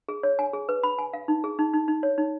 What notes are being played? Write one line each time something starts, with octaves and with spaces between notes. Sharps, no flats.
G#4
C#5
G#5
G#4
B4
B5
G#5
F5
D#4
G#4
D#4
D#4
D#4
C#5
D#4